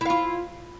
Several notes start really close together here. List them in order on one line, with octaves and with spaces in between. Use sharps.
E4 F5 F4